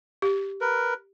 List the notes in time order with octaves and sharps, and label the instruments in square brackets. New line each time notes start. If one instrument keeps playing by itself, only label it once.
[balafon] G4
[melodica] A#4 B4